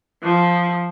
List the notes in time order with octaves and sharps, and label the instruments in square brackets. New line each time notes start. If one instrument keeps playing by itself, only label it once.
[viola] F3